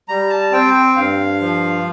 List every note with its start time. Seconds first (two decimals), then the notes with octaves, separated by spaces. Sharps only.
0.08 G3 A#5
0.30 A5
0.52 C4 G5
0.74 G5
0.96 G2 F5
1.41 F3